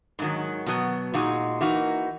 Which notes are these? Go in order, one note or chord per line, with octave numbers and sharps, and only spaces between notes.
G#2 D#3 F#3
B2 F#3 B3
A#2 G#3 D#4 F#4
E3 A#3 D#4 F#4